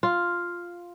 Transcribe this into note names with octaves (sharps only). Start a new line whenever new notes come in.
F4